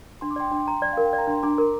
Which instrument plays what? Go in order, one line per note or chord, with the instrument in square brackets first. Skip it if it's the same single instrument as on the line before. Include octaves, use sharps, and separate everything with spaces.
[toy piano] D4 [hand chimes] C6
[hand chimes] D6
[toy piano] D5 [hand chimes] G5 C6
[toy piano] D4
A#5
D5
[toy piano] A#4 [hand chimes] F5
[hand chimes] G5
[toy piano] D5
[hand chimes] A#5
[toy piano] D4 [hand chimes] C6
[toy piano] D4 [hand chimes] A#5 D6
[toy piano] A#4